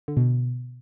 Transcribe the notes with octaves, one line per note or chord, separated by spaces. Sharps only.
D3
B2